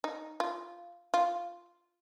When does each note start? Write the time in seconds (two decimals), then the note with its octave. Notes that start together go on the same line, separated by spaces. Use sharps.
0.04 D#4
0.40 F4
1.14 F4